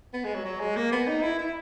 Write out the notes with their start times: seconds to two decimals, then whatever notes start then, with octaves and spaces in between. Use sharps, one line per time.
0.14 B3
0.24 G#3
0.35 F#3
0.45 F#3
0.60 G#3
0.76 A#3
0.92 B3
1.07 D#4
1.23 E4
1.39 E4